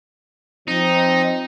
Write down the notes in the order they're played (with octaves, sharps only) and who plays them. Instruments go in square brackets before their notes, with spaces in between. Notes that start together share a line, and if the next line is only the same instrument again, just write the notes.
[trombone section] F3 C4 [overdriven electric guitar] D#4